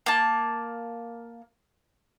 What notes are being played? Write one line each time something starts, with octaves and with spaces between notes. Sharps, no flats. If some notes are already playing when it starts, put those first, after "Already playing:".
A#3 A5